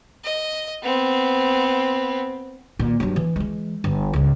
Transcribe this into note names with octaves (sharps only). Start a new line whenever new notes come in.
D#5
B3 C4
A#2 D#3
G2 F#3
E3
E3 G#3
G1
C#2 G#2